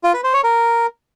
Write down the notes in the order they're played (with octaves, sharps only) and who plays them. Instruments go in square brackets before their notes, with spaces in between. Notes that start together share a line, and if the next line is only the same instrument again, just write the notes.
[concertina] F4
B4
C5
C#5
A#4